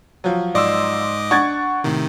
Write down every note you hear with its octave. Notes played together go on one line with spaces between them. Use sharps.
F3 F#3
G#2 D5 D#5 C6 D6 E6
D4 F#5 C#6 G#6 A6
A2 C3 D#3